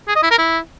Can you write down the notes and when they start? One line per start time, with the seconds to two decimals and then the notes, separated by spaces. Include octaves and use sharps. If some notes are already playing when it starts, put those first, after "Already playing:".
0.08 G#4
0.15 D#5
0.23 E4
0.31 A#4
0.38 E4